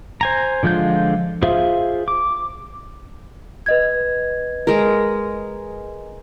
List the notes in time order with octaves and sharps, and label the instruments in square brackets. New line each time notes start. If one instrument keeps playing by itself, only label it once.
[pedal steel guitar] C5 G#5 A#5
D3 F3 G#3 F4 G6
F4 G#4 C5 E5 F5
D6
[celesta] B4 D#5 G#6
[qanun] G#3 A#4